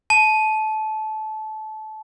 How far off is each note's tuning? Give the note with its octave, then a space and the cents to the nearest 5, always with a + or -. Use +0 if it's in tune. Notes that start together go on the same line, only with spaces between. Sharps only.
A5 -25